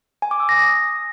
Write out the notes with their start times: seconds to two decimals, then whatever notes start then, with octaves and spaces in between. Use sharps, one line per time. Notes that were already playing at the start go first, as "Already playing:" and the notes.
0.22 G#5
0.31 D6
0.40 E6
0.49 A#6
0.58 D#6